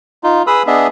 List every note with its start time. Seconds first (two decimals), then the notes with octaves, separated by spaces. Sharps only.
0.24 D#4 F4
0.47 G#4 B4 B5 D#6 E6
0.67 B3 D4 G#4 D#5 E5